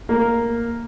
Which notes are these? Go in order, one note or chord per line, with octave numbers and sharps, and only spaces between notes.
A#3